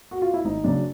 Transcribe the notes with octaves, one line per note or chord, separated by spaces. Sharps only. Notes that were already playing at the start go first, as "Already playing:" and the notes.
F#4
F4
E4
G#1 D#4
F#2 C#3 F#3 D4